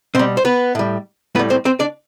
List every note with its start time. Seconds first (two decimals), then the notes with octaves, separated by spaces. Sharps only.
0.15 B2 G3 C4 C5
0.37 C5
0.45 B3 B4
0.75 A2 G3
1.35 A2 B3 B4
1.39 G3
1.50 C4 C5
1.65 C4 C5
1.80 D4 D5